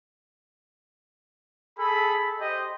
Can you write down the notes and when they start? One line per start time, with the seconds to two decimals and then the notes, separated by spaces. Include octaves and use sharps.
1.77 G#4 A4 B5
2.40 G4 C5 D#5